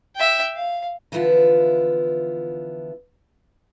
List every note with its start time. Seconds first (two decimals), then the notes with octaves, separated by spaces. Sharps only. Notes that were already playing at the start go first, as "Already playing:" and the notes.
0.16 E5 G5
0.56 F5
1.12 D3 E3 F3 B3 E4 F4